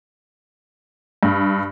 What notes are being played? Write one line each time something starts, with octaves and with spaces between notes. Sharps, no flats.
G2